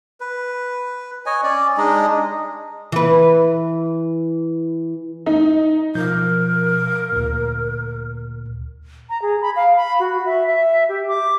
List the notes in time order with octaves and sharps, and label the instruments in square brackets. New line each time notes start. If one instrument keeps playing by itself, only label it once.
[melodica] B4
C#5 D#5 G#5
C#4 D5
G#3 D4 D#4 D#5
[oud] E3 B4
[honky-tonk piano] D#4
[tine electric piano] B2 F3 G6 [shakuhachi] A#4
[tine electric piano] D2 A#2
[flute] A#5
G#4
B5
F5
B5
F#4
E5
E5
G4
D6